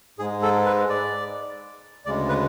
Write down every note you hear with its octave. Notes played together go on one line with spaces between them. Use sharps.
G#2 G#3 G#4
A4
B4
D5
D2 C#3 G#3 D5
B4